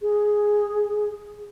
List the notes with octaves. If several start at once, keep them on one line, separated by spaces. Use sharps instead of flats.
G#4